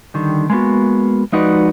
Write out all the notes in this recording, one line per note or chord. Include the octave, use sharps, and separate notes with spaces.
D3 D#3 G3
G#3 A#3 B3 F#4
F3 G#3 D#4 F#4 B4 D5